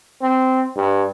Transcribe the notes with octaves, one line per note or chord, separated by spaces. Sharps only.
C4
G2